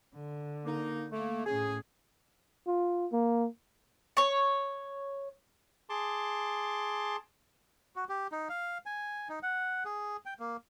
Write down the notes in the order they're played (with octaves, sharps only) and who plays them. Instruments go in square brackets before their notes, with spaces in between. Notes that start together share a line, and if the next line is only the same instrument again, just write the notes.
[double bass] D3
[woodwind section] A#3 D#4
A3 A#3
[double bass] A2 C#4 [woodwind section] G#4
[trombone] F4
A#3
[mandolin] C#5 C#6
[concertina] G#4 A5 C6 D6
[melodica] F#4
G4
D#4
F5
G#5
D#4
F#5
G#4
G5
A#3